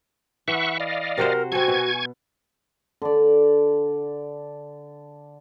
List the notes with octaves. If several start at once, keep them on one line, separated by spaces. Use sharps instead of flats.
E3 E5 F#5 C#6
D5 D#5 F5
C3 F#4 A#4 C5
C4 F#4 A4 G#5 C#6 G#6
B2
D3 D5